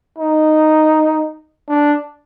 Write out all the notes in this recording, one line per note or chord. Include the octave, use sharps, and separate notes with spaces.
D#4
D4